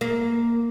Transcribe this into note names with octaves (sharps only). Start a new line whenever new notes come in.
A#3